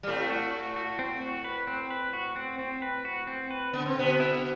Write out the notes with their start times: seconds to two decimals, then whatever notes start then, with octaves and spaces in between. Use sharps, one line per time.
0.03 G3
0.07 A2 A3 C4
0.30 F#4
0.53 F#4
0.76 F#4
0.99 C4
1.22 F#4
1.44 B4
1.67 C4
1.91 B4
2.13 F#4
2.36 C4
2.59 C4
2.82 B4
3.05 F#4
3.27 C4
3.51 B4
3.73 D3 B3
3.86 C4
3.96 B2 D3 B3
4.20 E4